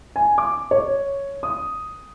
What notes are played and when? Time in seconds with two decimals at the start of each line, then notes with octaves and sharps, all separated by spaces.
0.16 G#5
0.38 D6
0.71 C#5
1.43 D#6